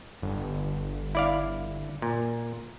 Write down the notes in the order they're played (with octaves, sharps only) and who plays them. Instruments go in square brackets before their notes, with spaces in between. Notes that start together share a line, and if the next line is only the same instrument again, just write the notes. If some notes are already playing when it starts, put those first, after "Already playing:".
[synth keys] G1
[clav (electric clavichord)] E4 D5 F5
A#2